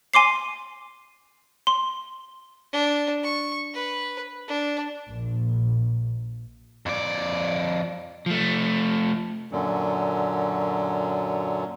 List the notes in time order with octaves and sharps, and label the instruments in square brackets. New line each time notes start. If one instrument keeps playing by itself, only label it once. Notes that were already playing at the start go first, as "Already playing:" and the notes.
[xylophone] G#5 C6 D6 C7
C6
[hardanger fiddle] D4
C#6
B4
D4
[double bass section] A#1
[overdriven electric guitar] F2 D5
F3 A3
[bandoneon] F#2 A#2 D3 F#3